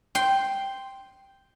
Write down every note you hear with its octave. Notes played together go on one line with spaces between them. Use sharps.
G5 C6